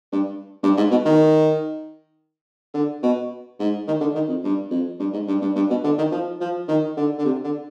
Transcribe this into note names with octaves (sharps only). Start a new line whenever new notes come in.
G2
G2
G#2
B2
D#3
D3
B2
G#2
D#3
D3
D#3
F2
G2
F2
G2
G#2
G2
G2
G2
B2
D3
D#3
F3
F3
D#3
D3
D3
C3
D3